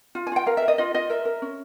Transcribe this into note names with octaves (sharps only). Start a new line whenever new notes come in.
F4
G#5
F4 G5
A#4 F5
E5
A#4
D#5
F4 D#5
F4 D#5
A#4 E5
A#4
C#4